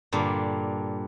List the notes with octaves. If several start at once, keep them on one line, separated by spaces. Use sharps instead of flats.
G2 A#2 D3 D4